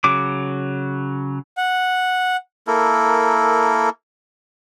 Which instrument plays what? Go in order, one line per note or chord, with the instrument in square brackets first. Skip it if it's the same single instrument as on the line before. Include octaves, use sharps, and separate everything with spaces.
[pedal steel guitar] C#3 F#3 D6
[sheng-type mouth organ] F#5
[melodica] A#3 E4 A4 A#4